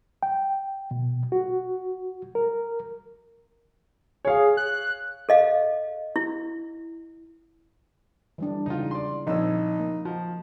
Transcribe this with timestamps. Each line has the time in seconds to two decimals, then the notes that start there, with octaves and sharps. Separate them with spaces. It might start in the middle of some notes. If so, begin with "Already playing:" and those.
0.23 G5
0.91 B2
1.32 F#4
2.35 A#4
4.25 G#4 C#5 F5
4.57 F#6
5.29 A4 D#5 F5
6.16 E4
8.38 E3 G3 D4
8.66 C#3 E3 D#4 F4
8.91 D5 C6
9.27 A#1 F3 C4 D#4 C#5 E6
9.79 A#3
10.05 F3 F#4